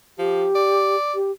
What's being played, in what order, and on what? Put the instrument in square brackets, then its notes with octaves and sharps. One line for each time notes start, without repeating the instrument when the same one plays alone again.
[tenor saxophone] F3 [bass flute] G4
[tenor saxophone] D5
[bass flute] G4